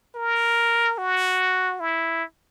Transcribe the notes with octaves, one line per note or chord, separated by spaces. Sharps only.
A#4
F#4
E4